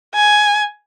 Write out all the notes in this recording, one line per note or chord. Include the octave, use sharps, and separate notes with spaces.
G#5